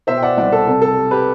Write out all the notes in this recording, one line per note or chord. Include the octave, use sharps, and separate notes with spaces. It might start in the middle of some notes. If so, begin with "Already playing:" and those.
B2 C5 E5
G5
D5 F#5
C2 D5 F#5
A4
C3 A4
A4
G3
G4 B4